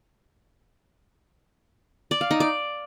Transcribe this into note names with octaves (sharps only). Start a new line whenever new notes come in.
D5
F5
D#4
D5